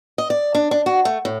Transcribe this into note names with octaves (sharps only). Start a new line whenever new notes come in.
D#5
D5
D4
D4
F#4
A3
A2